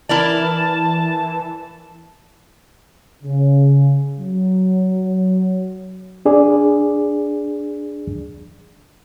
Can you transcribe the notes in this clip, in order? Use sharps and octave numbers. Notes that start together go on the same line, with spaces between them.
E3 E4 A#4 D5 A5
C#3
F#3
D4 G#4 D5